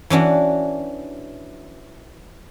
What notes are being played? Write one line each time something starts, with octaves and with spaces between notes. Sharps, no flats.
E3 C#4 D4 F#4